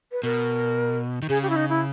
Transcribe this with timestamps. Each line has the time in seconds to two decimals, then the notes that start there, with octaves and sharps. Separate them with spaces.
0.12 B4
0.23 B2 A#4
1.22 D#3
1.29 C#3 G#4
1.43 G4
1.50 E4
1.56 D#4
1.69 E4